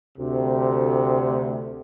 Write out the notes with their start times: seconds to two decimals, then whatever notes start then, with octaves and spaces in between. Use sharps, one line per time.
0.18 D2 C3